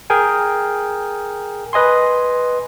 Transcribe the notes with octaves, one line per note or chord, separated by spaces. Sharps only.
G#4 A#4 G5 G#5
B4 D#5 G#5 C6